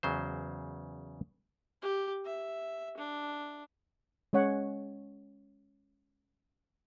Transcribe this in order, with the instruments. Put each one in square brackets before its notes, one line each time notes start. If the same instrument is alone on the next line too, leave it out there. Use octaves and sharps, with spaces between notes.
[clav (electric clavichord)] E2 C#3 F#3 C5
[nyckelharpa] G4
E5
D4
[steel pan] G#3 C#4 C#5 F#5